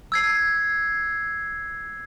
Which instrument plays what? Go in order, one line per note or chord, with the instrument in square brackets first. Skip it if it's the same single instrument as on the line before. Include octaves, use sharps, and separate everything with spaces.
[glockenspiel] E6 G#6 C7